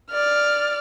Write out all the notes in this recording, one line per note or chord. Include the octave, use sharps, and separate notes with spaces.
D5 F6